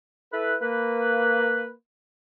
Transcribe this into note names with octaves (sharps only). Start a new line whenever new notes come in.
E4 A4 B4
A#3 B4